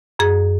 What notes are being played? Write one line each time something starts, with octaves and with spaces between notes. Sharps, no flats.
F#2 G#4